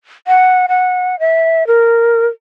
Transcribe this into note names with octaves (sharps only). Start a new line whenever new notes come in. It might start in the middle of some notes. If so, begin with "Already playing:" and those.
F#5
F#5
E5
A#4